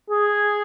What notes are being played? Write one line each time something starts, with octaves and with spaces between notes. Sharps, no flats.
G#4